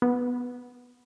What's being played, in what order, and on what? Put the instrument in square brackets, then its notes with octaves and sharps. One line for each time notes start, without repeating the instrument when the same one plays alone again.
[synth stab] B3